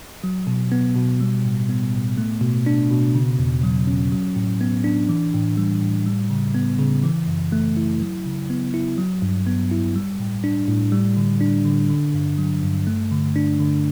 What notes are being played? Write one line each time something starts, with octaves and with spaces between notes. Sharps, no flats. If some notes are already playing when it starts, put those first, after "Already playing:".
F#3
B2
B3
B2
G3
A2
B3
A2
A3
B2
D4
B2
C#3
E2
F#3
C#4
F#3
A2
B3
D4
E3
A2
G3
A2
G3
C#3
B3
C#3
E3
F#2
A3
E4
F#3
C#3
B3
E4
F#3
G2
B3
E4
G3
A2
D4
A2
G3
D3
D4
D3
D3
G2
F#3
G2
A3
D3
D4
D3